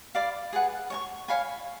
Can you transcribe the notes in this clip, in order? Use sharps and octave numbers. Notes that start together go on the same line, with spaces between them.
D5 F5 B5 D6
G#4 B4 F#5
C#5 G#5 C#6
C#5 F5 G#5 B5